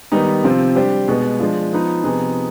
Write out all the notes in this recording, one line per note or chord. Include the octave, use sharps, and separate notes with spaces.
D#3 G3 B3 D#4
C3 F3 C4 F4
G3 D4 G4 C5
B2 G#3 B3
F3 G#3 D4 F4
F3 B3 D#4 B4
C3 F3 B3 D#4 G#4